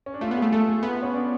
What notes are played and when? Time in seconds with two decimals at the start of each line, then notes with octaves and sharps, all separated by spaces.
0.06 C#4
0.14 D4
0.21 A3 F4
0.31 B3
0.37 G#4
0.42 A3
0.52 A3 A4
0.68 G#4
0.83 B3 F4
1.02 C#4
1.14 D4